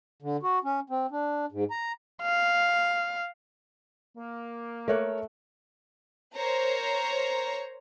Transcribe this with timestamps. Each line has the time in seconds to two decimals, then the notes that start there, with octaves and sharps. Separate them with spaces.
0.22 D3
0.43 F#4
0.64 C#4
0.90 C4
1.11 D4
1.52 G#2
1.71 A#5
2.22 F5
4.17 A#3
4.88 A3 A#4 C#5 F#6
6.36 A#4 C5 C#5 A#5